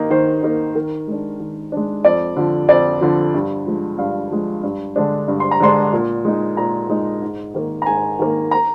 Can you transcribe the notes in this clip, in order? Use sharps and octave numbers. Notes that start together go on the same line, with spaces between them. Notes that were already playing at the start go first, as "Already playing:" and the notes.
Already playing: D#3 A#3 D#4
D#3 C5
A#3 D#4
D#3 A#4
G#3 D4
D#3
G#3 D4
F2 D5
D3 F3
F2 D5
D3 F3
G2
F3 G#3
G2 F5
F3 G#3
G2
D3 G#3 D4
G2
C6
A#5
D3 G#3 D4 C6
A#2
G#3 D#4
A#2 A#5
G#3 D#4
G#2
D#3 A#3
A#5
G#2 G#5
D#3 A#3
A#5